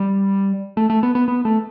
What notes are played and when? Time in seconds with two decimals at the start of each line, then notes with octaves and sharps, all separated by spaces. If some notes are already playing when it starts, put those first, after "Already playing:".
Already playing: G3
0.77 A3
0.90 A3
1.03 B3
1.15 B3
1.28 B3
1.45 A3